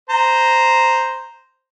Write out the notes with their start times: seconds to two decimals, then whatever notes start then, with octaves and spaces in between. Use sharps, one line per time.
0.10 C5 A#5